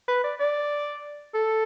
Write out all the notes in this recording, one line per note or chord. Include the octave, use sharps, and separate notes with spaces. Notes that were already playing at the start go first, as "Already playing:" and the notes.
B4
D5
D5
A4